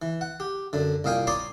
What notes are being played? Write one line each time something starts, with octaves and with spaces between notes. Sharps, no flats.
E3
F#5
G4
F#2 D3
C2 A#2 D#5 F5 G5 G#5
C#5 D5 A#5 C6 D6 D#6